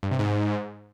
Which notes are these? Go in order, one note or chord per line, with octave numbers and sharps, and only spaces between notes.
G2
C3
G#2